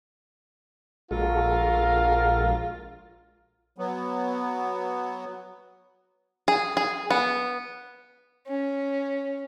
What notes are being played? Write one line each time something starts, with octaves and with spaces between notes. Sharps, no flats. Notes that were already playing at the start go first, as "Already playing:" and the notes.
A#1 G#3 F4 F#4 A4 A#4 F5
F#3 B3
G#4
G#4
B3
C#4